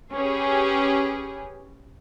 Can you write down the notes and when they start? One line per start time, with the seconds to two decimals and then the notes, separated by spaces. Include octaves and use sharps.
0.13 C#4 G4 G#4 B4